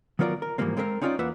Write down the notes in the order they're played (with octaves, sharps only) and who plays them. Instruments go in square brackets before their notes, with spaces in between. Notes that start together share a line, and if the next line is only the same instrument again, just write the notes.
[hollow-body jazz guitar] D#3 F#3 B3 F4 A#4 D5
A#4
G#2 E3 F3 G3 A#3 C4
G#3 C4 A4 A#4 E5 F5
C4 C#4 D#4 F4 A#4 D5
E2 A#3 F4 B4 E5 F#5